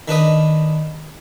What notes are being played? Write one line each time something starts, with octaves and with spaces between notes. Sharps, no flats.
D#3 D4 B4 D#5